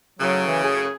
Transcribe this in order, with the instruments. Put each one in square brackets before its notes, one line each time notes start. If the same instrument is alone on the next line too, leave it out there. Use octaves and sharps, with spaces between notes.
[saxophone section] F#2 A2 C#3 [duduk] F#3
[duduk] E3
G#4